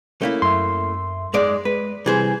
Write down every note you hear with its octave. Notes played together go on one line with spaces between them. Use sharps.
A3 A#3 C#4 E4
F#2 E5 C6
G#2 G#3 D5
G#3 B4
C3 E3 G3 G#4 C5 G#6